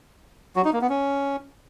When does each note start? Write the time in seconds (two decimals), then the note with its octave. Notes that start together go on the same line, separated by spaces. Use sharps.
0.56 F#3 F#4
0.65 D#4
0.73 A#3
0.81 B3
0.89 C#4